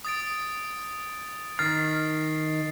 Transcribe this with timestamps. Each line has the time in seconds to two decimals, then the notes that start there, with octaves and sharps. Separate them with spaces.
0.05 D#6 A6 D7
1.59 D#3 F6 A6 C7